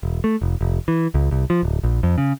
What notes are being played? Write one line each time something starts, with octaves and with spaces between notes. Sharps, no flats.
E1
A3
F1
F1
E3
C#2
C2
F3
D1
A#1
F2
C#3